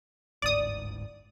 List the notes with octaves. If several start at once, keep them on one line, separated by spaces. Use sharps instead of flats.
D1 G1 G#2 D5 D#6